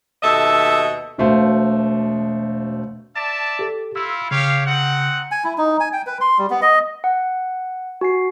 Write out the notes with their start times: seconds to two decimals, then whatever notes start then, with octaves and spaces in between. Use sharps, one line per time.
0.23 D#2 B2 A4 D#5 E5
1.18 E1 B2 A3 C5 F5
3.16 D5 E5 A5
3.59 G4 A4
3.96 E4 F4 E6
4.31 C#3 G4 C#5 F5
4.66 C4 D#4 F#5
5.31 G#5
5.44 E4
5.58 D#4
5.80 G#5
5.93 G5
6.07 B4
6.21 C6
6.38 G3
6.50 B3
6.62 D#5
7.04 F#5
8.01 F#4 G#5 C7